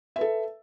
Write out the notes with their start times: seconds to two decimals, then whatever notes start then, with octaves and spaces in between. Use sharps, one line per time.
0.16 E5
0.18 B4
0.21 A4